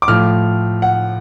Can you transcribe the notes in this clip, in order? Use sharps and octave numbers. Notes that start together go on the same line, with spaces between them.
D6
A2 F3 F6
F#5